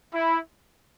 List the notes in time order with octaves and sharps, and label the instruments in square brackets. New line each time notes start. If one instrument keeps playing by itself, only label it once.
[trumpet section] E4